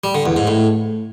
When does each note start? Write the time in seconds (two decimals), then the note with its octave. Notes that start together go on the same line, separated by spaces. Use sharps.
0.04 G3
0.15 D3
0.26 E2
0.36 G#2
0.47 A2